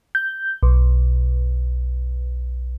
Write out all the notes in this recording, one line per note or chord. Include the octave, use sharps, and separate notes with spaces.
G6
B1